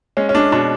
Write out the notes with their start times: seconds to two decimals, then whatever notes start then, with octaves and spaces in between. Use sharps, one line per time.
0.17 G#3 C#4
0.29 C#4
0.34 G#3 D4
0.52 B2 D4